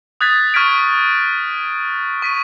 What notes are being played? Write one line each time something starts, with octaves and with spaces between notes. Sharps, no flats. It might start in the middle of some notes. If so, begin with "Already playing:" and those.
D#6 F#6 G#6 A6 B6
C#6 F6 G#6 B6 D7
C#6 B6 D#7